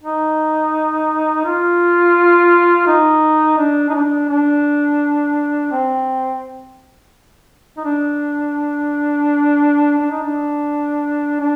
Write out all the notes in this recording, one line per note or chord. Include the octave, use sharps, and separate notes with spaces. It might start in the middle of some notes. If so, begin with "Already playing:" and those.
D#4
F4
D#4
D4
D#4
D4
D4
C4
D#4
D4
D4
D#4
D4
D4